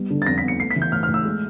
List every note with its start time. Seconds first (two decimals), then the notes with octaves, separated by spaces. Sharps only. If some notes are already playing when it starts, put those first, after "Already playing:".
Already playing: G3 B3
0.10 D3
0.22 A6
0.26 F2 A#6
0.38 B6
0.43 B3
0.48 C#7
0.59 A3 C7
0.71 B6
0.76 E3
0.82 G6
0.92 A2 F6
1.03 F6
1.09 A2
1.14 E6
1.25 G#3